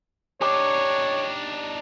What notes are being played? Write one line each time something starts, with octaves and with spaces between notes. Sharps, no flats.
D4 D#4 G4 C#5